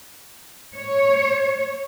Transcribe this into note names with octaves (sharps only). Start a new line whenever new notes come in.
C#5